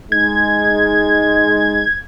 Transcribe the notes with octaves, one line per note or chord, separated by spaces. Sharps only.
G#3 D#4 G#6